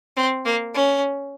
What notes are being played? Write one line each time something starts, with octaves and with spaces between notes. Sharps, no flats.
C4
A#3
C#4